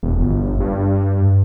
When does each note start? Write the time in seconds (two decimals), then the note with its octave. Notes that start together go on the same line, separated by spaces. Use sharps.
0.03 E1
0.20 G1
0.60 G2